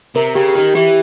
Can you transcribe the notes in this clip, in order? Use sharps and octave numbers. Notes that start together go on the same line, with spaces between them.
C3 A#4
C#3 G4
D#3 G4
E3 G4